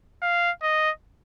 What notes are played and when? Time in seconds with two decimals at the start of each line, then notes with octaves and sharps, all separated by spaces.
0.22 F5
0.62 D#5